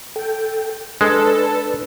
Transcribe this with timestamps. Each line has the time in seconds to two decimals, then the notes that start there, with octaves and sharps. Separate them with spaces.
0.16 A4 G5
1.01 G#3 D4 A4 B4